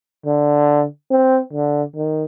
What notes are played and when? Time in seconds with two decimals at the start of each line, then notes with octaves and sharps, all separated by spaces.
0.26 D3
1.11 C4
1.53 D3
1.96 D#3